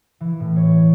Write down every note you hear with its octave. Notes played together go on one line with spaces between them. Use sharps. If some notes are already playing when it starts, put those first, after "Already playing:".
E3
A2
C#5